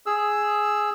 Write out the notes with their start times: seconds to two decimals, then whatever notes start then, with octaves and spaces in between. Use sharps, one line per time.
0.06 G#4 E6